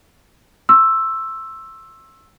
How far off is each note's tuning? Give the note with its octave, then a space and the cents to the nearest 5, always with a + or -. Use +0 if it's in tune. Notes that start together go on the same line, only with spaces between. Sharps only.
C6 +45 E6 +5